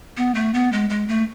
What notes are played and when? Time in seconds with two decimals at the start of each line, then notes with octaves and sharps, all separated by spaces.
0.17 B3
0.35 A3
0.54 B3
0.72 G#3
0.90 G#3
1.08 A3